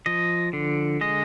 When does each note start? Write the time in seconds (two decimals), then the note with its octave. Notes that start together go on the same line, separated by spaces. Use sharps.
0.06 F3 D#5
0.53 D3
1.01 G#3 D#5